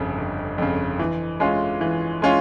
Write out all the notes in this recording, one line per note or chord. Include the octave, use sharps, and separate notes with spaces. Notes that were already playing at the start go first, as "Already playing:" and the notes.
Already playing: G1 F2 C#3
G1
F2 C#3
E3
G#3 C#4 F4
E3
G#3 C#4 F4